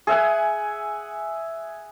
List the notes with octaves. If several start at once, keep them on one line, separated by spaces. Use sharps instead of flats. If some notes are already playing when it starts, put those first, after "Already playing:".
G#4 E5 F#5 G#5